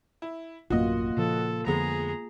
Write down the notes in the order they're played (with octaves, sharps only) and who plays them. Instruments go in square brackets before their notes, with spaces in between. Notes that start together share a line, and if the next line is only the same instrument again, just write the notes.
[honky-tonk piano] E4
[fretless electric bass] A1 F#2 B2 [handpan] A#3 F4 [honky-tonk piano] F#4 D#5
[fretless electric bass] A#2 C#3 F3 [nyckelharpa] A4
[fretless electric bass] F2 D3 F3 [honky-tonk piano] G#3 B3 [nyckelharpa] G#4 A#5